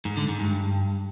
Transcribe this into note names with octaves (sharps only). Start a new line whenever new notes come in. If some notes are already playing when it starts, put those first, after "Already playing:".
G#2
D3
G#2
G2